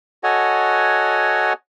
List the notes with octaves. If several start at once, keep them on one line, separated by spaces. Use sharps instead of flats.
F#4 A4 C#5 D#5 F#5 G#5